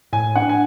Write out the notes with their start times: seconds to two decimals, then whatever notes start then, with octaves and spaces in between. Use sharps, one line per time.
0.13 A2 G#5
0.36 D4 F#5
0.49 G#5